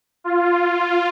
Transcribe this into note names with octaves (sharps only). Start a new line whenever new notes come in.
F4